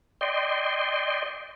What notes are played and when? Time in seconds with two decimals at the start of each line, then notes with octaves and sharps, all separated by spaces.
0.21 D5 D#5 G5 C6